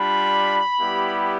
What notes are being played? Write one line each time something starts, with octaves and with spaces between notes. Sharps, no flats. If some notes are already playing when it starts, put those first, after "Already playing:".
Already playing: G3 D4 F4 B5
G3 B3 E4 G4